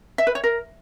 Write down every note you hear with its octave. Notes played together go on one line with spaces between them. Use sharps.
E5
B4
C#5
A#4